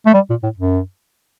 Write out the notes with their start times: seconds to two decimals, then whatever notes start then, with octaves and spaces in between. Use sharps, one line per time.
0.06 A3
0.14 G3
0.30 A#2
0.43 A2
0.58 F#2